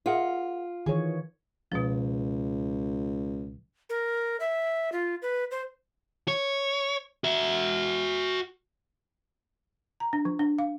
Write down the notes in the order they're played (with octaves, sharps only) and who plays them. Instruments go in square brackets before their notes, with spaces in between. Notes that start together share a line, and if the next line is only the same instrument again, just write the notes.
[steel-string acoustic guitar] F4 [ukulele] G#4 A#4 F#5
[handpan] D#3 E3 C#5 [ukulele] G#4
[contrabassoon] C#2 [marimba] B2 F3
[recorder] A#4
E5
F4
B4
C5
[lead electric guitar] C#5
F#4 E5
[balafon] A#5
D4
F3
D4
F5